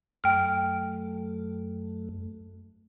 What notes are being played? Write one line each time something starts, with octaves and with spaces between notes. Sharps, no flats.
F#2 A3 G5 F6